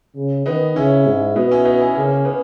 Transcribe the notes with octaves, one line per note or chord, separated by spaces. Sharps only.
C#3
D#3 B3 D#4
C#3 C#4 E4
G#2
B2 B3 D#4
C#4 E4
B3 D#4
C#4 E4
C#3 A#3 C#4
B3 D#4